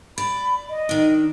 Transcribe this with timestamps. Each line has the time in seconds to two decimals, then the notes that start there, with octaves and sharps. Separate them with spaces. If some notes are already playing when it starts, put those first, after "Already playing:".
0.18 D5 B5
0.69 D#5
0.89 D#3 D4